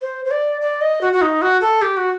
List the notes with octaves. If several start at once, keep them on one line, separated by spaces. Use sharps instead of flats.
C5
C5
D5
D5
D#5
F#4
F#4
D#4
F#4
A4
G4
F#4